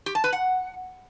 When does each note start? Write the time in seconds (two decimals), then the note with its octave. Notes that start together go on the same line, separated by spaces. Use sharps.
0.06 G4
0.15 A5
0.24 B4
0.33 F#5